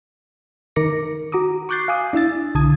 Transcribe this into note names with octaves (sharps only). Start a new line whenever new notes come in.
D#3 D#4 A#4 D6 A#6 C#7
F#4 A#5 D6 D#6
C#6 D6 F#6 G6 A6 C7
F5 G#5 D6 D#6
D4 E4 E6 A6
B1 D3 A5 D#6 G#6